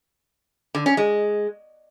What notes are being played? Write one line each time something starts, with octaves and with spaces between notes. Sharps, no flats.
D3
C#4
G#3